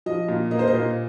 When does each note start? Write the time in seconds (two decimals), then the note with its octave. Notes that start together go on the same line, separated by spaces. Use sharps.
0.06 F3 D#5
0.28 A#2
0.51 A#3 D#5
0.59 C5
0.68 D#5
0.74 A#2